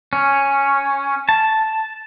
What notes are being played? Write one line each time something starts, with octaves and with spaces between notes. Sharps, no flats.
C#4
A5